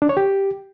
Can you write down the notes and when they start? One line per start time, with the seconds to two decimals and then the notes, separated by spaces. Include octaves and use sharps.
0.02 D4
0.09 C#5
0.17 G4